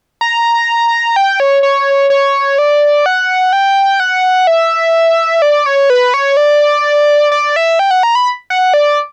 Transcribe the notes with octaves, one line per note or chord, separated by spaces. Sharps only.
A#5
G5
C#5
C#5
C#5
D5
F#5
G5
F#5
E5
D5
C#5
B4
C#5
D5
D5
E5
G5
F#5
A#5
B5
F#5
D5